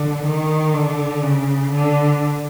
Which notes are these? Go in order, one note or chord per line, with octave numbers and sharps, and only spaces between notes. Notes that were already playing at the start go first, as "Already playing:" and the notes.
Already playing: D3
D#3
D3
C#3
D3